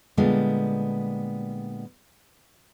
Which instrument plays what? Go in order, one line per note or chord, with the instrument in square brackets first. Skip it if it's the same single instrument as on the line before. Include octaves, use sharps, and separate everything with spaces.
[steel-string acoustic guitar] A#2 D3 G3 G#3 B3